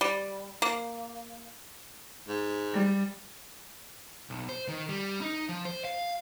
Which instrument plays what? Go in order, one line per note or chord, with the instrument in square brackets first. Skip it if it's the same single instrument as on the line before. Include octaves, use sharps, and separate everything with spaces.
[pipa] G3
A#3
[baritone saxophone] G#2
[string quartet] G3
[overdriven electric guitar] B1
C5
D#3
G3
D#4
F3
C5
F5